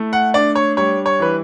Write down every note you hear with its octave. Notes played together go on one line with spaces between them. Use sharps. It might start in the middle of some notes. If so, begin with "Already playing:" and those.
Already playing: A3 E4
F#5
D4 D5
C#5
G3 C#5
C#5
E3 B4